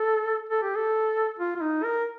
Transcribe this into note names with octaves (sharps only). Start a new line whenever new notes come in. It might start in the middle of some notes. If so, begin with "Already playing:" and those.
Already playing: A4
A4
G4
A4
F4
F4
D#4
A#4